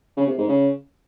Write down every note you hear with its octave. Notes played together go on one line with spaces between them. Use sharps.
C#3
C3
G#2
C#3